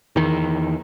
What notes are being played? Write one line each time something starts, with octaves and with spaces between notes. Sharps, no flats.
E2 D#3